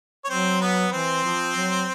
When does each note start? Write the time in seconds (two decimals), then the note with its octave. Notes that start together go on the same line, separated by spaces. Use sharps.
0.24 C#5
0.29 F#3 C4 C5
0.60 B3 B4
0.92 E3 C4 C5
1.25 F3
1.56 F#3